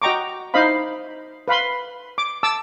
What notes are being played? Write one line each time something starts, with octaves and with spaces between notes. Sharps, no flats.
F#4 D#5 G5 A#5 C#6 D6
D#4 E4 C5 D#5 F5 B5
B4 F5 B5 C6
D6
A5 D6 E6